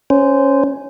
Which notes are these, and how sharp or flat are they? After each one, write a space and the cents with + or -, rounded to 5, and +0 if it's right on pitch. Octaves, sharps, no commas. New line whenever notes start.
C#4 +0 C5 -15